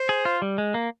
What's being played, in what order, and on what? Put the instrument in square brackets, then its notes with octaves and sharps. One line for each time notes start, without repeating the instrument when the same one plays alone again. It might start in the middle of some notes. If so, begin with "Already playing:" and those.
Already playing: [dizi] C5
[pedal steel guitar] G#4
F4
G3
G#3
A#3